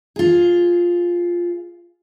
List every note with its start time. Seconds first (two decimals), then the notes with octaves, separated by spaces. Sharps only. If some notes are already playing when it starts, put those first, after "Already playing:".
0.16 F4 G#4